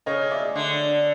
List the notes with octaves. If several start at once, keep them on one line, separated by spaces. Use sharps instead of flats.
C#3 C#5 D#5
D5 E5
D3